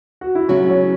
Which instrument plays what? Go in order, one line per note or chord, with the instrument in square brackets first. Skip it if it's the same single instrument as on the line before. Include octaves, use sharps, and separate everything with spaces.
[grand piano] F#4
E4
[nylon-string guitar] C#3 F#3 B3 F#4 [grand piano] C#4
[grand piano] C#4